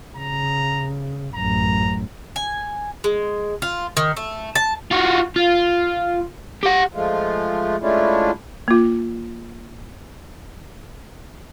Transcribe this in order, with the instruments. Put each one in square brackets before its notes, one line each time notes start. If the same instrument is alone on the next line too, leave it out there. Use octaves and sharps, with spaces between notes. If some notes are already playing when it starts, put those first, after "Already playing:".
[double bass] C#3 [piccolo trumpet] A#5
[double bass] A1 F#2 [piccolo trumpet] A#5
[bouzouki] G#5
G#3
F4
D#3
A3
A5
[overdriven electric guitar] F4 F#4
F4
G4 F#5
[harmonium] F3 G#3 A3 F4
G#3 A3 C#4 D4 E4 F4
[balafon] A#3 F4